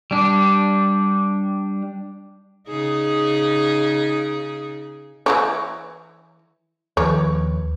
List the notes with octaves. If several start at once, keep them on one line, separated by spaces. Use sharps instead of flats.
G3 D4
C#3 D#4 G#4
E3 E4 C#5
D#2 F3 B4 C#5